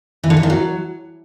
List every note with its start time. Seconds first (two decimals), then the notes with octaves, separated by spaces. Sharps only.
0.24 E3
0.30 D3
0.37 E3
0.43 D#3
0.50 F#3